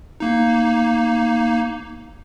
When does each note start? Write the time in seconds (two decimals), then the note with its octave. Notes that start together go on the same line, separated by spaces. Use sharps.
0.20 A#3 D#4